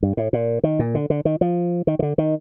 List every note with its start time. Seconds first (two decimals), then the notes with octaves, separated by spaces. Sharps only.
0.03 G2
0.17 A2
0.33 A#2
0.63 D#3
0.79 A#2
0.95 D3
1.10 D3
1.25 D#3
1.41 F3
1.87 D#3
1.99 D#3
2.02 D3
2.18 D#3